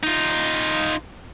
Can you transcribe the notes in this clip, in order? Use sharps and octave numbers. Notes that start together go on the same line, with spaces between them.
D#4 F4